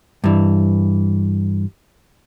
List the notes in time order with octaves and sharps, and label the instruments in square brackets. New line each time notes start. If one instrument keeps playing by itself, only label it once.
[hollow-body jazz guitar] G2 E3